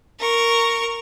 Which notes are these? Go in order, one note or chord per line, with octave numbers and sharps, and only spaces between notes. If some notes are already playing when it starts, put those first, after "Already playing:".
A#4 C#6